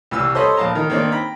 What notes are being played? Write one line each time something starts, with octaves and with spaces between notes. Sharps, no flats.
C2 E3 E6
A4 C5 C#5 D#5 B5 C6
A#1 F5 A5 A#5
D#3 A#4
D#3 A#3 C4 D4
G5 A#5 B5